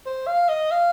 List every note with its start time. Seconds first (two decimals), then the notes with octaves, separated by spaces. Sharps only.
0.06 C5
0.27 F5
0.49 D#5
0.71 F5